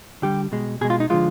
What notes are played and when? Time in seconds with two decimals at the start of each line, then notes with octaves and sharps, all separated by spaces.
0.22 D3 G3 G4
0.52 B2 G#3
0.81 B2 G#4
0.85 G#3
0.90 F4
1.00 D#4
1.10 D3 F3 G#3 F4